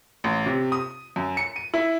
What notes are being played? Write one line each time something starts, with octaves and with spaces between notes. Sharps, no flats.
A1
C3
D#6
F#2
C#7
D#7
E4